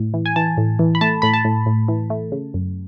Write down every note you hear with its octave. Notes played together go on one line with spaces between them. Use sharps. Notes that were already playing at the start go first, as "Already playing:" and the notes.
Already playing: A2
E3
G#5
E3 A5
A2
E3
B5
A3 A5
A2 B5
A5
A2
A2
E3
A3
C#3
F#2